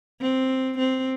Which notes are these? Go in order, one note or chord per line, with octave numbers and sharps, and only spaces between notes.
C4
C4